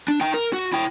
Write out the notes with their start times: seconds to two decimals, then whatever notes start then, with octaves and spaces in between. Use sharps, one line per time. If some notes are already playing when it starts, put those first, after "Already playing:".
0.08 D4
0.21 D#4 G5
0.34 A#4
0.53 F#4
0.73 E4 G5